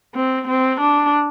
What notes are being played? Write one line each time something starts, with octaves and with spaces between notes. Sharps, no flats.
C4
C4
D4